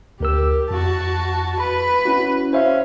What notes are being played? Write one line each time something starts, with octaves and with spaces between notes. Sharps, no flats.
D2 G4 A#4 E6
F2 F#4 A5
B4 B5
C#4 E4 F#4
C#4 C5 E5 F5